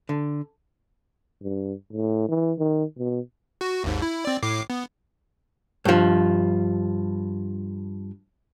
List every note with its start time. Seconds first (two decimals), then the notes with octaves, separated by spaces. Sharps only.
0.09 D3
1.42 G2
1.93 A2
2.29 E3
2.58 D#3
2.98 B2
3.61 F#4
3.84 G#1 D#2 G#2
4.02 E4
4.25 C4 D5
4.43 A2 D6 C7
4.70 B3
5.85 G2 F3